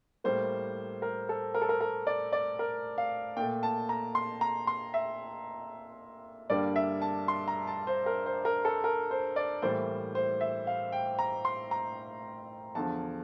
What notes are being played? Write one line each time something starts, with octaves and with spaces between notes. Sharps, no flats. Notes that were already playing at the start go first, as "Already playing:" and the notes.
A2 G3 A#3 C5
A#4
A4
A#4
A4
A#4
A#4
D5
D5
A#4
F5
A#2 A3 G5
A5
A#5
C6
A#5
C6
E5
G2 D3 G3 A#3 D5
E5
A5
C6
A#5
A5
C5
A#4
C5
A#4
A4
A#4
C5
D5
A2 E3 G3 A#3 C5
C5
E5
F5
G5
A#5
C6
A#5
E2 D3 F3 A5